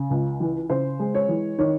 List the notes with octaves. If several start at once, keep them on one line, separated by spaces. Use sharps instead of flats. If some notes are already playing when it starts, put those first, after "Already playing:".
Already playing: C#3
C#2
E3
C#3 C5
G#3
C#5
E3
D#3 C#5